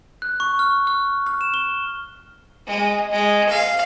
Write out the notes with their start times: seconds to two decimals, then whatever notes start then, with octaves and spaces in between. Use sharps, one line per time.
0.22 F#6
0.40 C#6
0.59 F6
0.87 F6
1.26 F6
1.41 E7
1.54 G7
2.67 G#3
3.11 G#3
3.50 F5